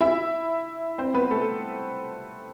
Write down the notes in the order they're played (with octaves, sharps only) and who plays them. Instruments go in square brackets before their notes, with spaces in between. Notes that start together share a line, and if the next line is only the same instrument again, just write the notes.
[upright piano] E4 E5
C4 C5
B3 B4
A3 A4